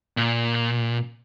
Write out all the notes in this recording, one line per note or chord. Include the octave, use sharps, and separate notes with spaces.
A#2